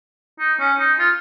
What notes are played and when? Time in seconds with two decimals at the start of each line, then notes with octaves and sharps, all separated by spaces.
0.40 D#4
0.59 C#4
0.79 D#4
0.99 F4